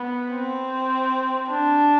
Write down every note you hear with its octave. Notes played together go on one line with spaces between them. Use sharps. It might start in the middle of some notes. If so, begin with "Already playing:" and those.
Already playing: B3
C4
D4